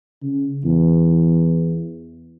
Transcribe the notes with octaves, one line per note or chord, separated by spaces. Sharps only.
C#3
E2